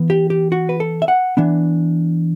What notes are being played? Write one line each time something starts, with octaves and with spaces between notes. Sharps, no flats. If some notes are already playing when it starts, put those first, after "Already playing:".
Already playing: E3 B3
G4
G4
F#4
B4
A4
E5
F#5
E3 B3 D4